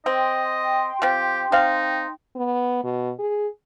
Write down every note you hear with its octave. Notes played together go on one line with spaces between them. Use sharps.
C4 D#5 G5 C6
F3 C4 G4
C4 D#4 F5
B3
B2
G#4